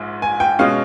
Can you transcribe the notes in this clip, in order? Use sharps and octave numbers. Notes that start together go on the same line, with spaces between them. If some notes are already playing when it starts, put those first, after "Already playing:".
Already playing: A#1 G#2
G#5
G5
B2 G#3 C#4 F5